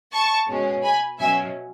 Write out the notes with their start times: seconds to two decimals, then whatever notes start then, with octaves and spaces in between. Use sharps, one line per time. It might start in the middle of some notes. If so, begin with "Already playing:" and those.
0.13 A5 C#6
0.48 B2 G#3 C#4
0.83 G#5 B5
1.19 B2 F#3 C#4 E5 G#5